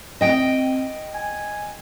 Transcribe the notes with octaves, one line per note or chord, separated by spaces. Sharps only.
C4 D#5 G5
G#5